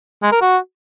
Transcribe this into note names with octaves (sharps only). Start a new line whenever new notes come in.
G#3
A#4
F#4